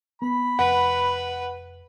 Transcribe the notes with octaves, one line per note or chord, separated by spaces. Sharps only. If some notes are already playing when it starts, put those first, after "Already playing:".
B3 B5
F1 B4 F#5